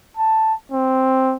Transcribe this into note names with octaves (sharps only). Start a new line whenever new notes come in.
A5
C4